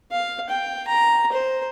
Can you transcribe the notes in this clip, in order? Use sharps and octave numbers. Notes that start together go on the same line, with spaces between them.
F5
G5
A#5
C5